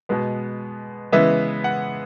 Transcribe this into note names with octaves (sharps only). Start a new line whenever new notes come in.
B2 G#3 B3
C#3 E3 G#3 B3 E5
F#5